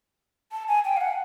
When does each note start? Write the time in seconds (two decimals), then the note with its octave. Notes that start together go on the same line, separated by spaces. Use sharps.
0.52 A5
0.68 G#5
0.85 G5
0.97 F5
1.01 F#5